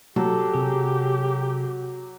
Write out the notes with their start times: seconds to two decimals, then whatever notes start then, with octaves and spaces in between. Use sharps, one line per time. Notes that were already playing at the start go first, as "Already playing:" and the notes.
0.16 F#3 G4 A4
0.54 C3 G#4